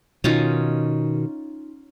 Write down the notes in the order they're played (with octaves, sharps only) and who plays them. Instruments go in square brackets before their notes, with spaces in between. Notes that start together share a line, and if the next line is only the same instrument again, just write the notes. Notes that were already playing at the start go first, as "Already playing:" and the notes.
[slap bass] B2 D#3 [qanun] C#4 D#4 F4